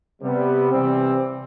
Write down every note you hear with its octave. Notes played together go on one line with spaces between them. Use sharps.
C3 G3 B3
C3 E3 G3 C4